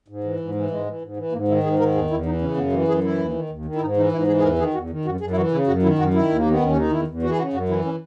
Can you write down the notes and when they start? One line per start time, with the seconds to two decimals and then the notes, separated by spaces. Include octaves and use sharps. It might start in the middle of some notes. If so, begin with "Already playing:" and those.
0.08 G#2
0.24 E3
0.40 G#2
0.55 E3
0.70 G#2 G#3
0.86 E3
1.01 G#2
1.16 E3
1.32 G#2 A#3
1.48 D#3 E4
1.63 G#2 G#4
1.79 D#3 A#4
1.94 E2 G#4
2.10 E2 E4
2.25 E3 D#4
2.41 C#3 C#4
2.57 F#2 B3
2.72 E3 A#3
2.88 F#2 G#4
3.03 E3 E4
3.18 D#2
3.34 D#3
3.50 D#2
3.65 D#3
3.75 E4
3.81 G#2 D#4
3.97 E3 D#4
4.12 G#2 E4
4.27 E3 G#4
4.38 G#4
4.43 E2 A#4
4.59 D#3 G#4
4.74 E2 F#4
4.90 D#3
5.05 F#2 F#4
5.20 F#2 G#4
5.31 E4
5.37 E3 F#4
5.51 C#3 E4
5.67 F#2 F#4
5.82 D#3 E4
5.98 F#2 F#4
6.14 D#3 E4
6.29 D#2
6.35 A#3
6.45 D#3 B3
6.60 D#2 C#4
6.76 D#3 D#4
6.91 E2 E4
7.07 E2
7.22 E3 F#4
7.30 G#4
7.38 C#3 F#4
7.53 F#2 F#4
7.68 E3 E4
7.85 C#4